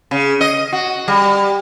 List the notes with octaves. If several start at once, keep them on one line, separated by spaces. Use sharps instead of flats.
C#3
D#5
F#4
G3